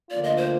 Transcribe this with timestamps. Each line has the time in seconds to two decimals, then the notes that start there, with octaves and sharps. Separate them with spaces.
0.10 D2 D3 F3 A#3 F4 D5
0.24 D#5
0.37 C5